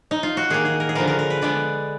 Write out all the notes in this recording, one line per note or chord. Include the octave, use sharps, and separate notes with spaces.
D#4
F4
F#4
D#3 A#3 G#4
G#4
A#4
G#4
D3 F3 B3 A#4
A#4
A#4
B4
D3 G#3 B3 D5